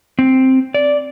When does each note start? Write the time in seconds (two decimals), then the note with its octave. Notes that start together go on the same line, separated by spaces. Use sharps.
0.19 C4
0.74 D5